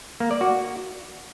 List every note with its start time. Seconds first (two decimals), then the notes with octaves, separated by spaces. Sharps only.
0.20 A#3
0.31 D5
0.41 F#4